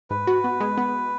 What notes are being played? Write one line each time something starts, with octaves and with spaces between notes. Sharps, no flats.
G#2 B4
F#4
B3
G#3
B3